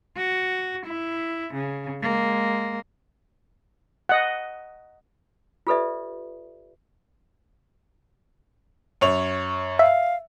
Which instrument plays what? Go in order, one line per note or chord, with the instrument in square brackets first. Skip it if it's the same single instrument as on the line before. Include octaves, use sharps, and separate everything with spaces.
[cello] F#4
E4
C#3
G#3 A#3
[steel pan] D#5 F#5
[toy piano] F4 G4 A4 B4 D5 E5
[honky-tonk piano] F#2 C#5 F7
[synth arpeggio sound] E5 [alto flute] F5